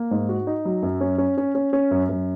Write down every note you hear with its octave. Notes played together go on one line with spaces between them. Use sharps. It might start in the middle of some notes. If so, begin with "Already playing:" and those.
Already playing: A#3
G#2
F#4
D#4
F#3
F#2
C#4
C#4
C#4
C#4
C#4
F#2
F#2